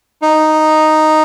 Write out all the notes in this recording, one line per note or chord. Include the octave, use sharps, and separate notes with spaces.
D#4